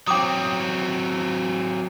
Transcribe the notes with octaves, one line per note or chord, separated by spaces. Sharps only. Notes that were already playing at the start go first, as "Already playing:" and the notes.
F#3 C4 G5 D6 D#6